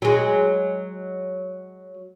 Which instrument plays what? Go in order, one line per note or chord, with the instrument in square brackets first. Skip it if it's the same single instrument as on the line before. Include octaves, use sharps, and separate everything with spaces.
[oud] F#3 G#3